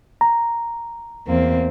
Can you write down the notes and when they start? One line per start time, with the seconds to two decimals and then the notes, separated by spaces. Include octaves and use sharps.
0.21 A#5
1.27 E2 A#3 C4